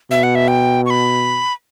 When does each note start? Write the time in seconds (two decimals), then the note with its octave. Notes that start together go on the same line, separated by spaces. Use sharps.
0.11 B2 E5
0.23 F#5
0.35 E5
0.48 G5
0.86 C#6
0.90 B5